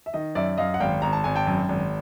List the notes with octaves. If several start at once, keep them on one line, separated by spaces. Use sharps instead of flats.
E5
D#3 D#5
F#2 D5 E5
F#2 D#5 F5
F#5
G#1 F5 G5
G#1 A#5
A5
G#1 G#5
G5 A5
F#2
G#1